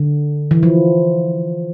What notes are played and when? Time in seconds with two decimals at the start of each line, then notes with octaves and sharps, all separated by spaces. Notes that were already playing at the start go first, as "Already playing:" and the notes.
Already playing: D3
0.51 E3
0.63 F3